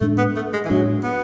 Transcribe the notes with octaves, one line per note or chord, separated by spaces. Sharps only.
A2 G#3 A3 D4
B3
A3
G#3
E3
A2 F#3 G#3 D4
B3